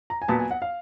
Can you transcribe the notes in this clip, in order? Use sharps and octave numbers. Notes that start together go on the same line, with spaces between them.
A#5
G#5
A#2 F#3 B3 A5
G#5
F#5
F5